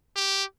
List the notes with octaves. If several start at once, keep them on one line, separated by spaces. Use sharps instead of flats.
G4